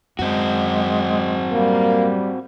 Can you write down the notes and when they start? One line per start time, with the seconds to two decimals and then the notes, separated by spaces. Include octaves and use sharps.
0.19 F#2 G#3 C4 F#4
1.52 G3 A#3